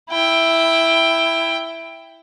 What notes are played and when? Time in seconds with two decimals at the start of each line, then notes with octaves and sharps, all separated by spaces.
0.10 E4 G5